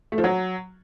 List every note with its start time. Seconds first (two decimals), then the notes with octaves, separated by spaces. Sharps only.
0.12 A3
0.18 F3
0.24 F#3